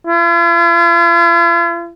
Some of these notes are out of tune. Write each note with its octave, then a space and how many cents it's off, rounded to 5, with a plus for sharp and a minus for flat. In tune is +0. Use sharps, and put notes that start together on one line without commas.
F4 -45